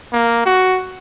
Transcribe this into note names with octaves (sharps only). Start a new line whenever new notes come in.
A#3
F#4